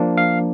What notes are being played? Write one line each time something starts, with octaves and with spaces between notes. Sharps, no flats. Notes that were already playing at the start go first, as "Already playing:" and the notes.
Already playing: F3 A#3 D4
F5